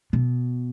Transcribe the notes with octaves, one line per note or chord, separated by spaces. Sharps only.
B2